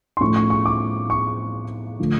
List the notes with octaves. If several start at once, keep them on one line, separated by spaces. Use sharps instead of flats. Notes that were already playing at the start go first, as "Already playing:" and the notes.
C6
A2 F3 A3 C#4 C#6
C#6
C#6
D6
C#6
D3 F3 A3